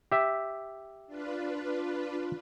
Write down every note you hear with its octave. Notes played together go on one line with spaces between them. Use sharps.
G4 E5
D4 F4 B4